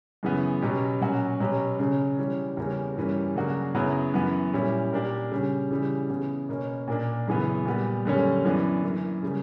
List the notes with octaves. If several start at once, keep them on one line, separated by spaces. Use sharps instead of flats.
F#2 C#3 E3 B3
B2 F#3 C#4 G4
A#2 F#3 C#4 F#4
B2 F#3 C#4 G4
C#3 F#3 C#4
E3 G3 C#4
E2 C#3 G3 A#3 C#4
G2 E3 G3 A#3 C#4
C#3 F#3 A#3 D4 F#4
F#2 C#3 F#3 B3 E4
F#2 E3 B3
A#2 G3 C#4 E4
A#2 A#3 D4 G4
C#3 G3 C#4
C#3 E3 G3
C#3 E3 B3
B2 A#3 C#4
A#2 A#3 D4
F#2 C#3 E3 B3
A#2 G3 B3
F#2 D3 G3 A#3 C#4
F#2 E3 B3 D4
F#2 E3 A#3
C#3 G3 A#3